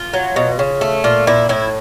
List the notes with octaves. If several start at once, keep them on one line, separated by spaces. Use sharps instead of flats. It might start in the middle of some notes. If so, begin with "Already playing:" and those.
Already playing: F4
F#3
B2
C#3
A3
A#2 F4
A#2 E4
A2 E4